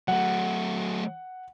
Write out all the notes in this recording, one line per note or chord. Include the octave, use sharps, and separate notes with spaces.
F#3 A3 F#5